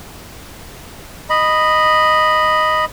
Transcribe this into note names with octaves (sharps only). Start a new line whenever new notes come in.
D#5 B5